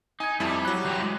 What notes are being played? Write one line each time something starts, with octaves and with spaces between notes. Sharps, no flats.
D#4 G#5 G#6
F2 G3 E4 A5
F#3 F#6
E3 F4 G4
G#3